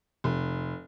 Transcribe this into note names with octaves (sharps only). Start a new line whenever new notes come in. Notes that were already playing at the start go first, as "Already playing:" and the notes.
F1